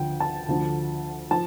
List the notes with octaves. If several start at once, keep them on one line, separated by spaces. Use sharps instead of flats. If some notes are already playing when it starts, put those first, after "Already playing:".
Already playing: D2 D3 F3 G5
A5
D2 D3 F3
F3 A5